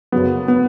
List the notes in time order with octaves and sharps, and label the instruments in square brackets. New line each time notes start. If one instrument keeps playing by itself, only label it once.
[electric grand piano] F#2 C#3 F#3 B3
B3